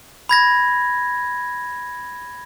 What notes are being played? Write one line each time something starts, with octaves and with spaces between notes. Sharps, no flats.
B5 G#6 A#6